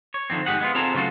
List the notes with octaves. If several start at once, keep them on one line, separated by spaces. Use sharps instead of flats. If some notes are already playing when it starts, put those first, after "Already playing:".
C#5
D3 D#3 F3 C4
G#2 G4 G#4 F#5
G#3 B3 F4
C4 F4 G#4 A4 A#5
C#3 F#3 A3 F4 F#4